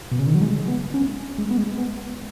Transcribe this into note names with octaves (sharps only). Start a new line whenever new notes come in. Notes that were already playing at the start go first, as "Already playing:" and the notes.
B2
C#3
D#3
F#3
G#3
B3
C#4
G#3
B3
G#3
B3